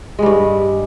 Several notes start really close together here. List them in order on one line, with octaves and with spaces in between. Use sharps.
G#3 G3 G2